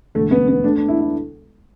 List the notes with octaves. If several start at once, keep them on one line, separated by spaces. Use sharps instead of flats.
E1 D2 D3 A3
B3
B3
D2 D3 D4
D4
E4
E4